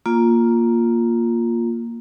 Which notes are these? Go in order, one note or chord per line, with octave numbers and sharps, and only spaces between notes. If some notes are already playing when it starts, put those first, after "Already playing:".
A#3 F4